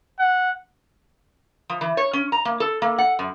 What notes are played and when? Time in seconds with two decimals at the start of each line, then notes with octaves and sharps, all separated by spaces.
0.19 F#5
1.70 F3
1.81 E3
1.97 C#5
2.13 C#4
2.32 A#5
2.45 A#3
2.60 A4
2.82 A#3
2.98 F#5
3.19 F#2